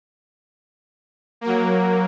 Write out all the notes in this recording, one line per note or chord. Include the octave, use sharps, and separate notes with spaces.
F#3 A#3